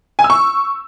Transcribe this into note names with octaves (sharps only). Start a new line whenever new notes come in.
G#5
E6
C#6